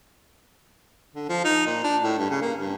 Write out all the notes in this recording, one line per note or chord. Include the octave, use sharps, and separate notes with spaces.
D3
F3
D#4
A#2
D4
A2
G2
C#3
A#3
G2